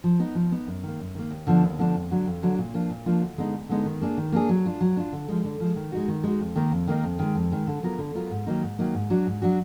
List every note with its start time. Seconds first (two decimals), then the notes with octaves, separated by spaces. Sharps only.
0.04 F3
0.20 B3 D#4
0.35 F3
0.52 B3 D#4
0.67 F#2
0.83 D#3 A#3
0.99 F#2
1.15 D#3 A#3
1.31 D#2
1.47 D3 F3 B3 D4
1.63 D#2
1.79 D3 F3 B3 D4
1.94 F2
2.10 D3 F#3 D4
2.27 F2
2.43 D3 F#3 D4
2.58 A#2
2.74 F3 A#3 D4 F4
2.90 A#2
3.06 F3 A#3 D4 F4
3.22 D2
3.38 D3 G#3 B3 D#4
3.53 D2
3.69 D3 G#3 B3 D#4
3.86 D#3
4.01 A#3 D4 G#4
4.17 D#3
4.32 A#3 D4 G#4
4.49 F#3
4.65 D4 F4
4.81 F#3
4.97 D4 F4
5.13 D3
5.29 F3 G#3
5.44 D3
5.60 F3 G#3
5.76 D#3
5.92 G#3 D#4 F#4
6.08 D#3
6.24 G#3 D#4 F#4
6.40 F2
6.56 D#3 A#3 D#4 A#4
6.72 F2
6.88 D#3 A#3 D#4 A#4
7.04 F2
7.19 D#3 G#3
7.35 F2
7.51 D#3 G#3
7.67 D3
7.83 F#3 B3 F4 A#4
7.98 D3
8.15 F#3 B3 F4 A#4
8.30 G#2
8.47 D#3 F#3 A#3 D#4
8.62 G#2
8.79 D#3 F#3 A#3 D#4
8.94 G#2
9.10 F#3 D4 F#4
9.26 G#2
9.42 F#3 D4 F#4